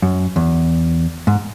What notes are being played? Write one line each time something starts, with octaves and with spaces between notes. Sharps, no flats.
F#2
E2
G#2